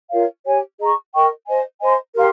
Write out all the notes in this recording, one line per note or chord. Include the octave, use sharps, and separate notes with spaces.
F4 A#4 C#5 F5
G4 C#5 G#5
G#4 D#5 A#5 C#6
A#4 D#5 G5 C#6
C5 D#5 G#5
C5 D#5 G#5 C6
G4 A#4 F5 C6